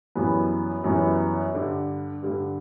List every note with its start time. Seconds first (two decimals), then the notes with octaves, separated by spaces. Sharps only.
0.15 F#2 E3 G3 B3
0.84 F#2 E3 G3 B3
1.54 G2 D3 G3
2.22 G2 D3 G3